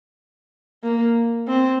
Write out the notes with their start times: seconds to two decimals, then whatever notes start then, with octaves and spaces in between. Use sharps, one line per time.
0.83 A#3
1.48 C4